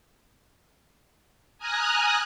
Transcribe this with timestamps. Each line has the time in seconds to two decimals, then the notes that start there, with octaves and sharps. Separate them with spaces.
1.58 G#5 A#5 D#6 F6 F#6